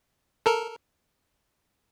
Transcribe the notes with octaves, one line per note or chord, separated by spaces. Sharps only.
A4 A#4